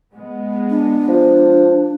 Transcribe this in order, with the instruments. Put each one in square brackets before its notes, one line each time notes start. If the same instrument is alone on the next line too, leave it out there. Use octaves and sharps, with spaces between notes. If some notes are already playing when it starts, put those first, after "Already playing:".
[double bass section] G#3 B3
[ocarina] D4
[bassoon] F3